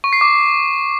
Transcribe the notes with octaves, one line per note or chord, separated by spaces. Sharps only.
C#6
C7
D6